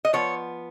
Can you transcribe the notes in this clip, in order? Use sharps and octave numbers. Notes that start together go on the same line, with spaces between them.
D#5
F3 B3 C#5